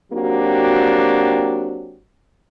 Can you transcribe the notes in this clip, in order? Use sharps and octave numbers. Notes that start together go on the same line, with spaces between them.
F#3 A#3 C4 D4 F#4 G4